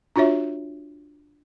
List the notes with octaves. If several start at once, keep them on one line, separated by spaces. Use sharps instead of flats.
D4 F4 F#4 C#5 E5